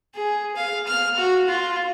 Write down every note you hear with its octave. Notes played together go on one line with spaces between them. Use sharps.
G#4
F5
F6
F#4
F4